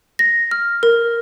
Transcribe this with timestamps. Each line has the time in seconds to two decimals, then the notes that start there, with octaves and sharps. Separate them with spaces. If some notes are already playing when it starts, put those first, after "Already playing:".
0.19 A#6
0.51 F6
0.83 A#4